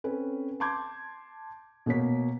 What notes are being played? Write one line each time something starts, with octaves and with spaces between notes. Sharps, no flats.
C4 C#4 A4 B4
A5 C6 D6 G6 G#6
B2 A#3 B3 C#5 B6